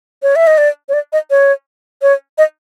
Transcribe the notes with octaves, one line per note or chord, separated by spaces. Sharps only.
C#5
E5
D#5
D5
C#5
D5
D#5
C#5
C#5
D#5